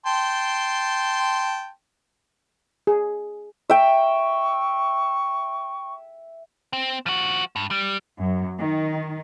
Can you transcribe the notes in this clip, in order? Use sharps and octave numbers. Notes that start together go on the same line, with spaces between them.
G5 A5 C6
G#4
E5 G5 C#6
C4
F3 F#4
G2
G3
F#2
D#3